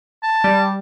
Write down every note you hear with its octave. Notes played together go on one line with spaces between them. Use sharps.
A5
G3